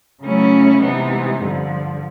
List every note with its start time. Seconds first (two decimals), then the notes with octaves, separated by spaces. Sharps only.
0.22 C#3 F#3 A3 C#4 E4
0.82 C3 E3 G#3 B3 D#4
1.43 G2 D3 F3